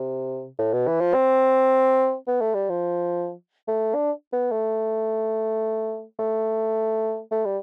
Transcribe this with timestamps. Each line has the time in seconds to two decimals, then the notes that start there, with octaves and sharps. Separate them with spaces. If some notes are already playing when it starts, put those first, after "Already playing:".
Already playing: C3
0.59 A2
0.73 B2
0.87 E3
1.01 F3
1.14 C4
2.27 B3
2.41 A3
2.55 G3
2.69 F3
3.68 A3
3.95 D4
4.33 B3
4.52 A3
6.19 A3
7.32 A3
7.45 G3